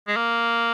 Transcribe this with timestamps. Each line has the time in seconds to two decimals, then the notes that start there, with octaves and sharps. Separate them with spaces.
0.08 G#3
0.16 A#3